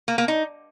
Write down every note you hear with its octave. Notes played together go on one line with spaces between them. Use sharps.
A#3
A#3
D#4